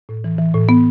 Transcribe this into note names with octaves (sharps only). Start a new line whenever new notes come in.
A2
E3
E3
A2
A2 B3